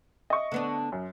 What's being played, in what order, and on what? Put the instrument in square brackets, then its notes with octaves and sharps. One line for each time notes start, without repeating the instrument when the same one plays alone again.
[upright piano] D#5 E5 C#6
[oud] D3 B3 D4
[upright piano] F#2